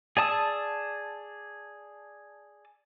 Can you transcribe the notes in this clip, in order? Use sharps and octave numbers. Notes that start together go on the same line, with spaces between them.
G#4 D5 A5 D#6 E6